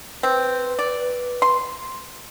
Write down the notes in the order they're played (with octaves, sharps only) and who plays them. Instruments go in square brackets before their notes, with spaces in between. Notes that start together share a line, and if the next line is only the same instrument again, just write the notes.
[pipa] C4 [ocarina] B4
[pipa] D5
C6